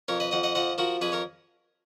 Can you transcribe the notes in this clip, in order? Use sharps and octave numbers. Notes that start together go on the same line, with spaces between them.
F2 A#4 C#5
B4 D#5
F2 D#5 F#5
D#5 F#5
F3 D#5 F#5
F3 F#4 A#4
F2 G#4 B4
A#4 C#5